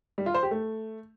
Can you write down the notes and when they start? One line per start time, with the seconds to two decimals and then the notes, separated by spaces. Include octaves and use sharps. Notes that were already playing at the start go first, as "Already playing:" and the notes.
0.18 G3
0.26 F4
0.35 C5
0.43 G4
0.51 A3